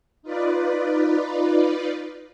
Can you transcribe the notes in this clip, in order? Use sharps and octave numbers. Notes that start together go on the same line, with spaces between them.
D#4 F4 B4 D5